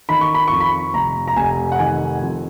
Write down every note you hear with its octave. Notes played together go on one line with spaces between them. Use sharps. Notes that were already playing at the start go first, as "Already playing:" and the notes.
D#3 B5
C#6
B5
F2 C#6
B5
F1 A#5
A#5
F1 G#5
F#5
D#3 G#5
F2